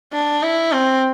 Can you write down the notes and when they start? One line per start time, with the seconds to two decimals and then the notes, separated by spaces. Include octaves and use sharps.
0.13 D4
0.43 E4
0.73 C4